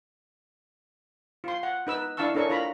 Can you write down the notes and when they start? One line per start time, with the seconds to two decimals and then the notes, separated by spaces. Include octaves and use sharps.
1.44 F4 C6
1.63 F#5
1.87 D#4 B4 E6
2.17 D4 E4 F5 A5 C#6 E6
2.35 D4 A4 A#4 C#5 C#6
2.50 F4 A#4 A#5 B5